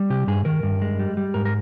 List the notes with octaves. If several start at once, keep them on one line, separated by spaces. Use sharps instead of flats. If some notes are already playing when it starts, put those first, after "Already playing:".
Already playing: G3
C3 G4
G2 G#4
D#3 A#4
G2
G#3
G3
G3
G#2 A#4
A#4